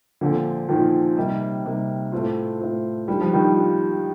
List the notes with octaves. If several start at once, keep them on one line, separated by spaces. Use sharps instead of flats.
A#2 D3 F3 C4
A#2 D#3 F3 C4
C3 G3 A#3 D#4
C3 G3 A#3 D#4
A2 A3 C4 F4
A2 A3 C4 F4
D#3 G3 A#3 D4 F4
F3
D#3 G3
D#3 A#3 D4 F4